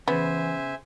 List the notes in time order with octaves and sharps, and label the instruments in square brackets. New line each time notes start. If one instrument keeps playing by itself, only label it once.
[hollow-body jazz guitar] C#3 [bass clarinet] E3 [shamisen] B3 [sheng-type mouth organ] C5 E5 G#5